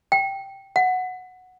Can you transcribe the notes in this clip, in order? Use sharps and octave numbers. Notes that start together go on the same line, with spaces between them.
G5
F#5